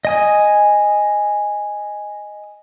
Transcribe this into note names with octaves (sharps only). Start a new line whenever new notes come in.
D#5 G#5 D#6